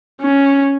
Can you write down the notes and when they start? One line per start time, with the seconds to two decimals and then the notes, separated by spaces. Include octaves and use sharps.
0.21 C#4